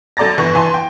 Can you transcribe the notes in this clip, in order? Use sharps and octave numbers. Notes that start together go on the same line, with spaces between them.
F#2 A4 D5 A#5 A6 A#6
G1 E3 C#6 A#6
E3 G#5 A5 C6
G5